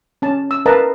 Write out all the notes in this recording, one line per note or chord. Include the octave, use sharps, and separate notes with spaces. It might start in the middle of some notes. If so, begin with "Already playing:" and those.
C#4 A5
E6
A#4 B4 D#5 F5 A5 A#5